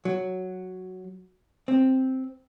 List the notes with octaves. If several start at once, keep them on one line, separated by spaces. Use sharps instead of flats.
F#3
C4